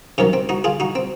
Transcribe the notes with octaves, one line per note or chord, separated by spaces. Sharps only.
C3 D#3 F#3 C#4
C4
D#4 F#4
F4 G#4
D#4 F#4
C4